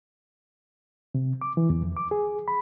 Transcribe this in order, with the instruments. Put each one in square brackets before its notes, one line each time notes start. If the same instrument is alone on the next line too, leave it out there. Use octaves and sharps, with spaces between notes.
[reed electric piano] C3
D6
E3
E2
F2
D6
G#4
B5